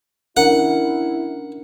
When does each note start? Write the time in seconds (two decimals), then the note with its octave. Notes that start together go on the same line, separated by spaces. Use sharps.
0.37 C#4 D4 E4 A#4 F#5